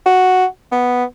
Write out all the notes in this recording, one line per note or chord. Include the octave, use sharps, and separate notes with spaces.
F#4
B3